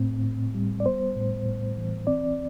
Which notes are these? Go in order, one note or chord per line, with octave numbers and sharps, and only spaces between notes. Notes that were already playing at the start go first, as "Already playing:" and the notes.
Already playing: A2 C4
A2
G3
D5
B3 C5
A2
A2
E3
C4 D5